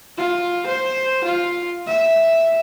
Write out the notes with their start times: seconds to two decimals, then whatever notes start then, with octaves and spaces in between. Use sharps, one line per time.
0.17 F4
0.67 C5
1.24 F4
1.87 E5